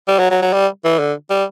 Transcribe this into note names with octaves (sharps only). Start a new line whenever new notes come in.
G3
F#3
F#3
F#3
G3
E3
D3
G3